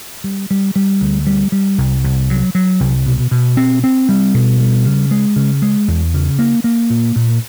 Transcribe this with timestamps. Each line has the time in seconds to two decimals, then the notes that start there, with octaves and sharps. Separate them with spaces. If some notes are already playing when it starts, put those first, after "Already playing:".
0.24 G3
0.51 G3
0.76 G3
1.01 D2
1.27 G3
1.52 G3
1.78 C2
2.04 C2
2.30 F#3
2.55 F#3
2.80 C2
3.06 B2
3.31 B2
3.57 C4
3.83 C4
4.09 G3
4.34 B2
4.60 G3
4.85 C#3
5.11 G#3
5.36 C#3
5.62 G#3
5.88 E2
6.14 C#3
6.39 A#3
6.64 A#3
6.90 A#2
7.16 A#2